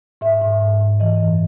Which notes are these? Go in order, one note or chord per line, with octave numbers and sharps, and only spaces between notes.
G#2 E5
G#2
G#2
G#2
E3 D#5
F#2